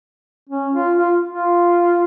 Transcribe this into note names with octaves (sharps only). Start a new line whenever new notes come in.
C#4
F4
F4
F4